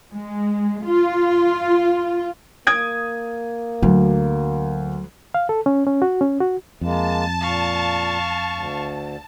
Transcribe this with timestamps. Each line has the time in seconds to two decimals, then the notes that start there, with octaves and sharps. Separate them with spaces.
0.11 G#3
0.85 F4
2.67 A#3 D#6 G#6 D7
3.82 D2 F#3
5.34 F5
5.49 A4
5.66 C#4
5.87 C#4
6.02 F#4
6.21 C#4
6.41 F#4
6.81 F2 G#3 A#3 A5
7.41 A#2 F5 C#6
8.50 D2